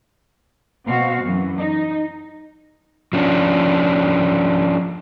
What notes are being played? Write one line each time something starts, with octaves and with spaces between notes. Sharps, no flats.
B2 C4 F#4 F5
F#2 E3
D#4
F3 C#4 D4